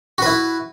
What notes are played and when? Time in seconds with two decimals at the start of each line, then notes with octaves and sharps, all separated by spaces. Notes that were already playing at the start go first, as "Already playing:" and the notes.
0.18 F#4
0.22 B4
0.26 E4